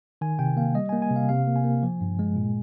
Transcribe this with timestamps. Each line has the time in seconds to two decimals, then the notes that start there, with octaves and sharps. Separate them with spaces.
0.21 D#3 G#5
0.39 C3 G5
0.57 A#3 F5
0.74 G3 D#5
0.89 A#3 G#5
1.02 G#5
1.11 C3
1.16 F5
1.29 C3 F5
1.47 A#3
1.56 G#5
1.64 A#3
1.83 F3
2.01 G2
2.19 G#3
2.36 A#2